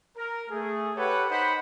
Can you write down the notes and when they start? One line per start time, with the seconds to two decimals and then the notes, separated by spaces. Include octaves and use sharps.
0.17 A#4
0.50 A3 G#4
0.95 G4 A4 B4 C#5 F#5
1.30 D#4 C5 F#5 B5